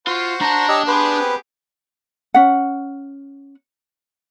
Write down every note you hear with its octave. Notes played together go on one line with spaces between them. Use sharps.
F4 F#4 C5
D4 A5 A#5
G4 C#5 D#5 E6
B3 G4 G#4 B4 C6
C4
C#4 F#5